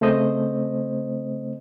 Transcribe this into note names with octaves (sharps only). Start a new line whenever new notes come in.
C#3 A3 C4 C5 D#5